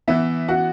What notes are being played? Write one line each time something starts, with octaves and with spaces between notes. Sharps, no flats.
E3 B3 E4 E5
F#4 F#5